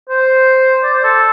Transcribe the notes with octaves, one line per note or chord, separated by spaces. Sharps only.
C5
D5
C5
A4